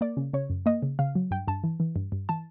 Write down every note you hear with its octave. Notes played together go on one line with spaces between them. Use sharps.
A#3 D5
C#3
C#3 C#5
F#2
A#3 D#5
C#3
C#3 F5
F#3
G2 G5
G2 A5
E3
E3
G2
G2
E3 A5